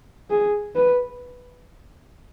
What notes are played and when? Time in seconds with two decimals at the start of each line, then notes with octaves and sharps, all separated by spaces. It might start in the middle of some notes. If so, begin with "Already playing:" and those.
0.30 G#4
0.76 B4